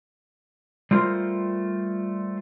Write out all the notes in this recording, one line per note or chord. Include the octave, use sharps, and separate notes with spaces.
G3 A3 F4 A#4 C5